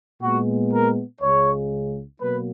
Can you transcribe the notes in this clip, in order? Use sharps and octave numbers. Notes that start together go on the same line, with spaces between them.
A#2 G#3 B3 F#4
A#4
C#2 C#3 G#3 C#5
B2 F#3 A#3 B4